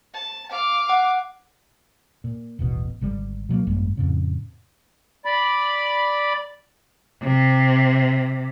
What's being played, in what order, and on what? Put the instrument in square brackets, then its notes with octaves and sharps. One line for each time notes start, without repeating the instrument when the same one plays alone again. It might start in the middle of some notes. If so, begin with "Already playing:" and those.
[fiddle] A5
F5 D6
[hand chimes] F#5
[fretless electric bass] A#2
D#1 A1 B2
G#1 D3 G3
B2 F#3 G#3 A#3
G#1 F#2 G3 A#3
F2 A2 C#3
[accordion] D5 B5
[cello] C3